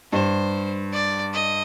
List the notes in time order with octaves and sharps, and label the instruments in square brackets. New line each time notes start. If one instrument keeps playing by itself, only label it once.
[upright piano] G2 [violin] C5
[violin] D5
D#5